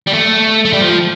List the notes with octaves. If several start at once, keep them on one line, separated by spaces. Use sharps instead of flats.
G3
A3
A3
G3
F3